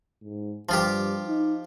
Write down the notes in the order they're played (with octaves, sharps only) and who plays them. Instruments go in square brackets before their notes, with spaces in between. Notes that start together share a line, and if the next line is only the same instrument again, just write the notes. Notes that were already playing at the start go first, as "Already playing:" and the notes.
[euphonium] G#2
[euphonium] G2 [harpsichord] F3 F4 G4
[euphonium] D#4